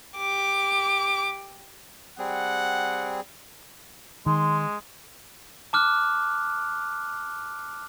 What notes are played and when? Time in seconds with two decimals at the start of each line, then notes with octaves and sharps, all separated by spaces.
0.17 G4 D6
2.19 G3 C4 G#4 F#5
4.26 D#3 G#3 C6
5.73 A5 D6 F6 F#6